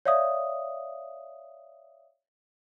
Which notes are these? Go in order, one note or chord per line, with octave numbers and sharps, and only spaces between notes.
C#5 D5 E5 F5 D#6